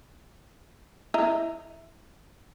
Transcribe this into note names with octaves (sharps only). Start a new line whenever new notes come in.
E4 D#5 A#5